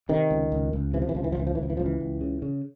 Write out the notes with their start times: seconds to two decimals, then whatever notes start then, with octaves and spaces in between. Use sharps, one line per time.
0.09 C3 D#3
0.31 C#2
0.52 C#2
0.73 C#2
0.93 C3 E3
1.02 F3
1.09 E3
1.15 C#2 F3
1.24 E3
1.32 F3
1.36 C#2 E3
1.47 F3
1.55 E3
1.58 C#2 F3
1.70 E3
1.77 C#2 F3
1.86 E3
2.00 C#2
2.21 C#3
2.42 C#3